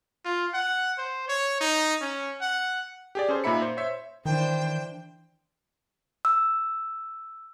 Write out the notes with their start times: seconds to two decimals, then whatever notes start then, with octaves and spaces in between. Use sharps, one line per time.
0.25 F4
0.54 F#5
0.98 C5
1.28 C#5
1.61 D#4
2.01 C#4
2.41 F#5
3.15 G4 G#4 D5
3.29 C#4 G#4 A4 C5
3.44 A#2 A#3 D#4 E5 B5 C#7
3.62 C5
3.77 C5 C#5 E5
4.25 D#3 E3 D4 C5 G5
6.25 E6